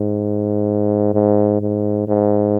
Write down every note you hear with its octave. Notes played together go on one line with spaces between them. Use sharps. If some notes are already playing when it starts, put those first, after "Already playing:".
Already playing: G#2
G#2
G#2
G#2